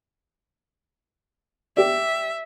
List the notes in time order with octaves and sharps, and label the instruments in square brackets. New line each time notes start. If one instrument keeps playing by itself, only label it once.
[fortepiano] G4 D5 [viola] E5